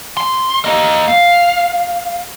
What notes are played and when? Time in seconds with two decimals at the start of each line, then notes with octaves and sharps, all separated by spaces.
0.17 C6
0.64 A#3 D#5
1.08 F5